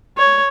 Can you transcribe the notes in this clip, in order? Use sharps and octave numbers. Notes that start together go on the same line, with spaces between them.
C#5